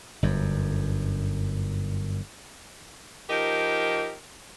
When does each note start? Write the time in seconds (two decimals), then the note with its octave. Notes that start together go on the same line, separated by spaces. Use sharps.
0.23 G1 F#2
3.30 F3 D#4 G4 A#4